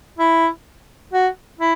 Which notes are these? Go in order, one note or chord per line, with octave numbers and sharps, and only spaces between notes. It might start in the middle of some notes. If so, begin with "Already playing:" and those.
E4
F#4
E4